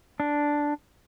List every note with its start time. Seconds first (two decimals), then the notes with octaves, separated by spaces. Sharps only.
0.20 D4